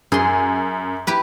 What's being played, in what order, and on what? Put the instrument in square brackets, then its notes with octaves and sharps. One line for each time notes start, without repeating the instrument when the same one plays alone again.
[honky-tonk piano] F#2 [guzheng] G#4 C6
[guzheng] E4 G4 B4